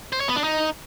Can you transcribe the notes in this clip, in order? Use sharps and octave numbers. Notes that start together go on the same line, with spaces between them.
C5
C#5
B3
D4
D#4